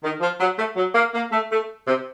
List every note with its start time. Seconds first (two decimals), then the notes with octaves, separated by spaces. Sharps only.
0.03 D#3
0.21 F3
0.40 F#3
0.58 A3
0.77 F#3
0.95 A#3
1.14 A#3
1.32 A3
1.52 A3
1.88 C3